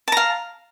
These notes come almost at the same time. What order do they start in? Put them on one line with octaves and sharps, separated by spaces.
A5 A#5 F5